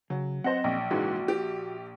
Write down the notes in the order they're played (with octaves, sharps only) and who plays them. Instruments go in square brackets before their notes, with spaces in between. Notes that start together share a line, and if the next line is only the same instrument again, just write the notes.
[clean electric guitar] C#3 [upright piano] F#3
[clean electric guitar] C4 D#5 [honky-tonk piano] C5 F#5
[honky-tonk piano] A#1
[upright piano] C#2 G#2 E3 [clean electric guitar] F#4
[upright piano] G4